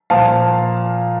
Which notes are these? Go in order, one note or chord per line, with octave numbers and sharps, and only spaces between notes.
A#2 F3 F5 A5